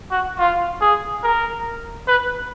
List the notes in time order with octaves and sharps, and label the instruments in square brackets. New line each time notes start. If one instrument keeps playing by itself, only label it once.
[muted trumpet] F#4
F4
G#4
A#4
B4